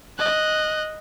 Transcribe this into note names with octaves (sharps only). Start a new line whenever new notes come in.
D#5 F#6